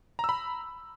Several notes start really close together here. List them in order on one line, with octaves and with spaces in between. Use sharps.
A#5 E6 B5